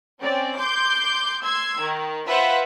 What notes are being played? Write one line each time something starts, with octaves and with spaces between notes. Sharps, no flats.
C4 C#4 D5
C6 D6 G6
C6 E6 G#6
D#3
F4 B4 C5 E5 F#5